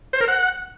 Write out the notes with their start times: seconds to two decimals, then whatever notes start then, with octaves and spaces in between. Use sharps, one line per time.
0.13 C5
0.21 A#4
0.28 F#5